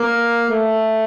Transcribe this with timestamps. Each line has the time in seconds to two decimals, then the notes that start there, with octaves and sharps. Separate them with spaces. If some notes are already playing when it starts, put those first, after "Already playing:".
Already playing: A#3
0.49 A3